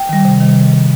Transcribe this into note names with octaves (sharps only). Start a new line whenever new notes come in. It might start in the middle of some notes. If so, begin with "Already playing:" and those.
Already playing: G5
D#3 G3
C3
D#3 G3